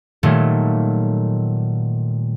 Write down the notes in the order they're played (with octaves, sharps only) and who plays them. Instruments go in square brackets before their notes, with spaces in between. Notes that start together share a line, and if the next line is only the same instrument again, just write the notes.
[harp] A#2 D#3 F#3 G3 A3